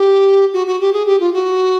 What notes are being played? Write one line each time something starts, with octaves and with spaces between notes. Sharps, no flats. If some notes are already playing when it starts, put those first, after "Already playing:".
Already playing: G4
F#4
F#4
G4
G#4
G4
F4
F#4